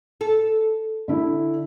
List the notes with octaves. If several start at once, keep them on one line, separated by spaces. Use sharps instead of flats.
A4
D3 E4